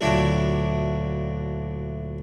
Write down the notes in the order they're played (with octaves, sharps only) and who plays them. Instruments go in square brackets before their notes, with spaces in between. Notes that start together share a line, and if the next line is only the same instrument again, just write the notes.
[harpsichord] D2 A#2 F#3 D4 E4